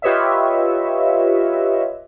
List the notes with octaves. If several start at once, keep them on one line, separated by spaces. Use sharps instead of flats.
F4 G4 B4 C#5 D#5 E5